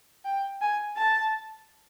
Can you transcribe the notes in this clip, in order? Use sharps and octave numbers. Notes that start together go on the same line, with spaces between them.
G5
G#5
A5